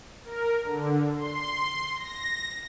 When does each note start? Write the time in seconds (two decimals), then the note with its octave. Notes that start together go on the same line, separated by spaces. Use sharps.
0.24 A#4
0.64 D3
1.16 C6
1.96 A#6